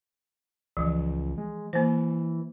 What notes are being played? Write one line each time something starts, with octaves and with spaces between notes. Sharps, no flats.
C#2 E3 F3
G#3
E3 A#3 C5